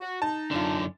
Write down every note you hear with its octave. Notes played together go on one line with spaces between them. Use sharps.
F#4
D#4 A5
F#2 D3 D4 F4